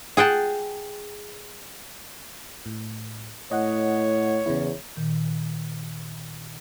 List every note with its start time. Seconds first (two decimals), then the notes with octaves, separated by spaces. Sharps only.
0.17 G#4 F#5 G5 A5
2.66 A2
3.51 A2 C#5 D#5 F#5
4.46 E2 C#3 E4
4.97 A#2 D#3